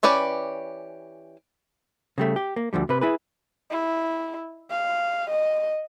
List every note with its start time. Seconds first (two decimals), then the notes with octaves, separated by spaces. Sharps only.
0.03 E3 C#4 G4 B4 D5
2.18 C#3 G3 A3
2.36 G4
2.56 A#3
2.73 D2 D3 F3 G3
2.89 C3 B4
3.01 E4 G#4 B4
3.71 E4
4.71 F5
5.30 D#5